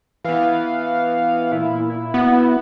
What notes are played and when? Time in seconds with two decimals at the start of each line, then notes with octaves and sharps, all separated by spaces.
0.24 E3 B3 F5
1.52 A#2 E4
1.89 E4
2.14 B3 F#4